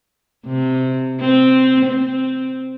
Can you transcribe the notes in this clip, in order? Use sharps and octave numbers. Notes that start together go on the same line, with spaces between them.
C3
C4
C4